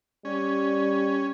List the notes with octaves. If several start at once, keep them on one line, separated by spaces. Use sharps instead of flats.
G3 C#4